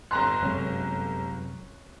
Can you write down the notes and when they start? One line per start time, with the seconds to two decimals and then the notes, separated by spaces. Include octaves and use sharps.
0.11 G1 A#5 C6 F#6
0.43 F#2 C3 G#3 C#4